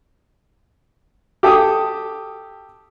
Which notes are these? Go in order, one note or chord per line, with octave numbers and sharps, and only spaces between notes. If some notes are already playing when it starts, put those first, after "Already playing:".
G4 A4 D6 D#6